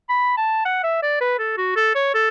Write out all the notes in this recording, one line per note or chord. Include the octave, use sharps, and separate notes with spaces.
B5
A5
F#5
E5
D5
B4
A4
F#4
A4
C#5
A4